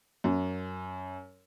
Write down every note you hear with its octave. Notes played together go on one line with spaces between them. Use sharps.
F#2